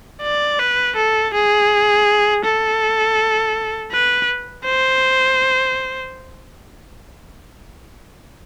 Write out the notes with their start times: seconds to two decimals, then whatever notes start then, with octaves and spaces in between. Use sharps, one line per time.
0.22 D5
0.59 B4
0.96 A4
1.34 G#4
2.44 A4
3.92 B4
4.65 C5